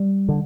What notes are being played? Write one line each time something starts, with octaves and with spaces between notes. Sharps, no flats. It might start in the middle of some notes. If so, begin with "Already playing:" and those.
Already playing: G3
D3